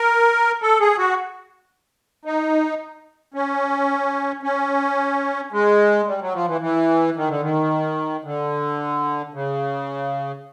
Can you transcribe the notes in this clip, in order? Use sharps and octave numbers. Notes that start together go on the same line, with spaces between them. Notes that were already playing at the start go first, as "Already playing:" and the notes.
Already playing: A#4
A4
G#4
F#4
D#4
C#4
C#4
G#3
G3
F#3
F3
E3
E3
D#3
D3
D#3
D3
C#3